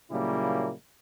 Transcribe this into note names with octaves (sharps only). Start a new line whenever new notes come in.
A#2 C#3 F#3 G3 A#3 E4